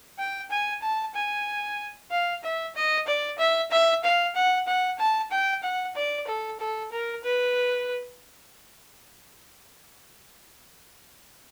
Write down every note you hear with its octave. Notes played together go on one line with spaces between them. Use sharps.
G5
G#5
A5
G#5
F5
E5
D#5
D5
E5
E5
F5
F#5
F#5
A5
G5
F#5
D5
A4
A4
A#4
B4